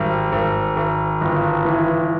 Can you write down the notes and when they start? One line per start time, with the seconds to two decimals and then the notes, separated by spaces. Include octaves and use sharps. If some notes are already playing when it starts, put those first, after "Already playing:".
Already playing: G#1 G3
0.32 G#1
0.76 G#1
1.21 G1
1.65 E3